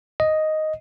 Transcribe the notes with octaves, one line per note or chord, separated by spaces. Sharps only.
D#5